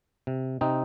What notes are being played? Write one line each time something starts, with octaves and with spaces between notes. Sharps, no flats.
C3
C3 C4 D#4